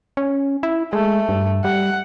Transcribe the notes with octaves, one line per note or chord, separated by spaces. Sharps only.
C#4
E4
G#3 A3
G2
G3 F#5